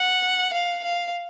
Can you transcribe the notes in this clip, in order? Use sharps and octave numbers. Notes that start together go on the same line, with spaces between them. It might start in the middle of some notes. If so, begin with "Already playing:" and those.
Already playing: F#5
F5
F5